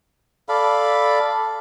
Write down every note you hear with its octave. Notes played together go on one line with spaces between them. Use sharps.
A4 D5 F5 B5